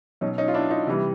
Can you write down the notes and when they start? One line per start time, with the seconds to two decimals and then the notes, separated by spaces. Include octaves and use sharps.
0.21 B2 F#3 C#4 D#4
0.38 C#4 D#4
0.48 F4
0.54 D4 E4
0.70 D#4 F4
0.87 C3 E3 G3